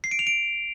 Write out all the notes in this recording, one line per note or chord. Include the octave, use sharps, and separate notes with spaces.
C7
D7
F7
D7